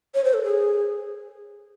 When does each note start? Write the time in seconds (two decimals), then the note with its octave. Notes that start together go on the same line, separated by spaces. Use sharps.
0.14 C#5
0.24 C5
0.34 A4
0.43 G#4